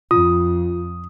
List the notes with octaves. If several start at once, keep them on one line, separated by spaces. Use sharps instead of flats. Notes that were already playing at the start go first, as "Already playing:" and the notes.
F2 F4 D#6